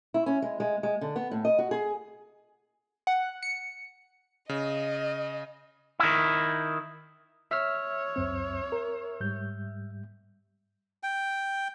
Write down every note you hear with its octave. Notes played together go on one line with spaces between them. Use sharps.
E4
C#4
G#3
G#3
G#3
D3
B3
A2
D#5
F#4
G#4
F#5
C#7
C#3 D#5
D#3 E4
C#5 E5 E6 F6
C#2 F#2 C4
A#4
G#2 G3 G6
G5